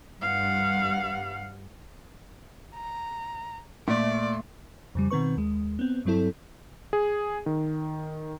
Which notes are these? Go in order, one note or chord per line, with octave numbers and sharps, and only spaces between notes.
G2 F5 F#5
A#5
A#2 A3 D5
F2 C#3 G3
B2 D#3 C4 B4 C#6
D#2 G#3
B3 C4
G2 F#3 C4 E4 A4
G#4
D#3